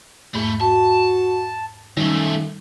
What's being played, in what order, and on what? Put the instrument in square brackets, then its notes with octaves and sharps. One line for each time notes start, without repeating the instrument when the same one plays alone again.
[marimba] E2 G#2 B5 [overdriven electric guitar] A3
[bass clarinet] F#4 [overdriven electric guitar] A5
[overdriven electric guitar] F#2 A3 [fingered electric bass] D#3 [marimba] G3 [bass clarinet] C#4